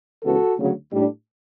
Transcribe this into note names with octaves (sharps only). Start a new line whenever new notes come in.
C#2 C#3 E3 B3 F#4 A4
D2 C#3 F#3
A2 G3 D4